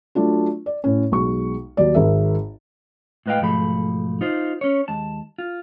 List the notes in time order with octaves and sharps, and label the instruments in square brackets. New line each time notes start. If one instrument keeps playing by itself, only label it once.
[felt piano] F#3 A3 D4 F4
D5
A2 C#4
B1 G#3 C#6
D#2 F#3 D5
G#1 G#4 A#4 E5
[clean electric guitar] A2 G#3 B4 D#5 F5 G5
B1 G#2 F3 A3 B5
D#4 F4 C5
C#4 C#5
D#2 G#3 A5
F4